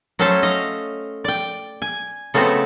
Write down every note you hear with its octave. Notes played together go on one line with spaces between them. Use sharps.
F#3 A3 C#4 A4 C5 A5
D#5 F5
D5 G5
G#5
C#3 A3 B3 C4 F#4 A4